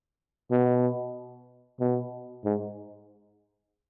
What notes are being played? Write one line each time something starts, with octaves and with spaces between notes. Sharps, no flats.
B2
B2
G#2